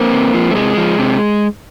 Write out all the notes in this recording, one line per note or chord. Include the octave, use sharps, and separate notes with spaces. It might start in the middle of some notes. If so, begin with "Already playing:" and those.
Already playing: A#3 C4
C3
F3
A3
C3 G#3
F3
C3